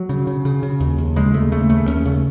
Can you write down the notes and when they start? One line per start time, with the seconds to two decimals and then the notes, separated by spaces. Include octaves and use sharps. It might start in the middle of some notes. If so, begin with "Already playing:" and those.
Already playing: F#3
0.09 C#3
0.27 C#3
0.45 C#3
0.63 C#3
0.80 D#2
0.98 D#2
1.16 C#3 G#3
1.34 D#2 A3
1.52 C#3 A3
1.70 D#2 A3
1.87 D#2 C#4
2.05 C#3